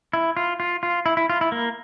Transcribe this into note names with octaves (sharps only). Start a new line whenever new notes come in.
E4
F4
F4
F4
E4
E4
F4
E4
A#3